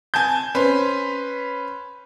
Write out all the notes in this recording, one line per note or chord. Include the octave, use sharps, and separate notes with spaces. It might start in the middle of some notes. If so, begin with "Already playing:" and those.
G#5 A5 G6
C#4 B4 C5